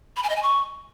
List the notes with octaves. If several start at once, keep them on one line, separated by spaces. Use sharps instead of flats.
B5
G#5
D#5
G#5
C#6